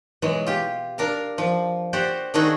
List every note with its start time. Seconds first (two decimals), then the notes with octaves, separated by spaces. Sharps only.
0.22 B2 E3 F#3 G#3
0.46 F4 G4
0.98 D4 A#4 F5
1.38 F3
1.93 F#4 G4 C5 D5 F#5
2.34 D#3 A3 D4 E4 F#4 G#4